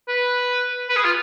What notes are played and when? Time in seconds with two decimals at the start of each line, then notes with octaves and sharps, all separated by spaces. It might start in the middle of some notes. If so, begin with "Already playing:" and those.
0.08 B4
0.89 B4
0.96 G#4
1.05 F4